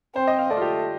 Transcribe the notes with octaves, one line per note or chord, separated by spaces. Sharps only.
C4 C5
D#5
F5
A3 D5
F4
G4